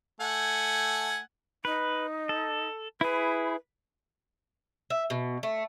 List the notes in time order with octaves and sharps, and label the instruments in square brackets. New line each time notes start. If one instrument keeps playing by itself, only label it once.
[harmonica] A3 F#5 G#5
[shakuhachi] D#4 [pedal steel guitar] B4
[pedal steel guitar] A4
[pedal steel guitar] E4 G#4 [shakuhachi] B4
[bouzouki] E5
B2
A3